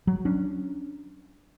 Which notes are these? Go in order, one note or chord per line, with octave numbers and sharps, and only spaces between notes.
F#3
C#4 D4